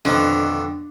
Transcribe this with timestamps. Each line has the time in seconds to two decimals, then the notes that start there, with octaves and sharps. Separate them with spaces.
0.05 F2 B2 D3 D#3